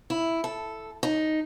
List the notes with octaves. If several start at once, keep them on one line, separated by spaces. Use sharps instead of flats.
E4
A4
D#4